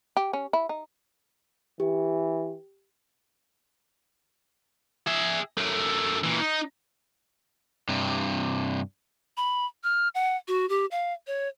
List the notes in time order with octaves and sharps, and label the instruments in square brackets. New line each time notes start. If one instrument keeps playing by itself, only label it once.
[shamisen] G4
C#4
E4
D#4
[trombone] E3 [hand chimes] G4
[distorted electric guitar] G#4 E5
F#2 A3
A#2 E3
D#4
[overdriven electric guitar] G2 C3
[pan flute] B5
F6
F#5
F#4
G4
F5
C#5